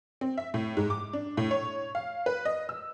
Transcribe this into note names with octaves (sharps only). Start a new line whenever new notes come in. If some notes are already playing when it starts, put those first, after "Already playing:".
C4
E5
A2
G#2
D6
D4
A2
C#5
F5
B4
D#5
E6